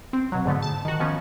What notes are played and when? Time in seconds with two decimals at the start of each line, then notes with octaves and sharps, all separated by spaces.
0.13 C4
0.32 B2 F#3
0.46 G#2 D3 A3 B3
0.62 A5
0.85 D#3 F#4
1.00 D#3 F3 B3 C#4